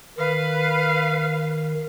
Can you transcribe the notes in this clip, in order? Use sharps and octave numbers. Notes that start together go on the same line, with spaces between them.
D#3 B4 F5